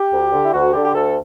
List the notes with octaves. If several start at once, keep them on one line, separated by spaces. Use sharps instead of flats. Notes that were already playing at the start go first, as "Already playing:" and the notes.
Already playing: G4
D2
D3
E4
D2 F#4
D3 G4
G4
D2 A4